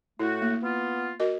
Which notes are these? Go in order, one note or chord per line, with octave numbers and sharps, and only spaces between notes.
A2 A3 E4 F#4
A#3
B3 F4
F#4 A#4 D#5